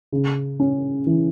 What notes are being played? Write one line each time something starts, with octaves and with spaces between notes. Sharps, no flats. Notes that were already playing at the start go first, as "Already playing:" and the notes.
C#3
C#4
E3